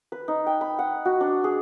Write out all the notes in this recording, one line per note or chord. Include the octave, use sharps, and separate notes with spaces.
B4
D#4
G5
B5
F#5
F#4
D4
G#4